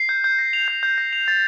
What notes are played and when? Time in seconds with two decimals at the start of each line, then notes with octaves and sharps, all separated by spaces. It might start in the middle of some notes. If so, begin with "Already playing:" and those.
Already playing: C7
0.09 G6
0.24 G6
0.38 A#6
0.53 F7
0.68 G6
0.83 G6
0.98 A#6
1.13 F7
1.28 A6